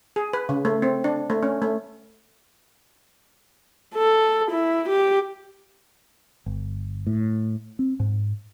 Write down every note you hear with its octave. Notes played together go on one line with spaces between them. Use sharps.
G#4
B4
C#3
A3
C4
D4
A3
C#4
A3
A4
E4
G4
G1
A2
C4
G#2